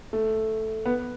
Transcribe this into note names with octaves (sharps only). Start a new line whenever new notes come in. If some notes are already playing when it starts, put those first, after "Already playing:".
A3
B3